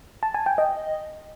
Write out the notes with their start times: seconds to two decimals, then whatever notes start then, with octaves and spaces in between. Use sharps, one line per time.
0.23 A5
0.34 G#5
0.46 G5
0.58 D#5